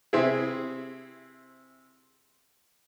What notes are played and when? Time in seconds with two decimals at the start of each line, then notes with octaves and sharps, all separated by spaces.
0.13 C3 C4 E4 G#4